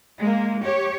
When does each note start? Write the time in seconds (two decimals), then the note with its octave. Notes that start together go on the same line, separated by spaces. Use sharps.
0.19 G#3 A#3
0.62 G4 C#5